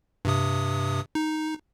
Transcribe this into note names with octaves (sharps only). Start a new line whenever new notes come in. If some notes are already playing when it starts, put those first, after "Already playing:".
G2 C3 D#6
D#4